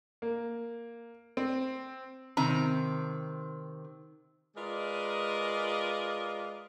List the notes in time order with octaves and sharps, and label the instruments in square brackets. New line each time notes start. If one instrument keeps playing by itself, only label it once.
[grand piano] A#3
C4
[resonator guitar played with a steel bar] C3 D#3 C4 A#5
[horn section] G#3 F4 A#4 B4 D5 D#5